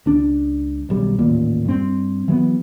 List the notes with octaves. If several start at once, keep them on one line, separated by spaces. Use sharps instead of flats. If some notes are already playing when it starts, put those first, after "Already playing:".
C#2 D4
D#1 B1 G3
A1 D#2 A#2
G2 C4
E3 F#3 A#3 B3